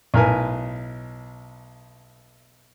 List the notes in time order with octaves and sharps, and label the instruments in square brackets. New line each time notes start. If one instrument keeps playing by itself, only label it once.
[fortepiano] B1 A2 A#4 B4 G#5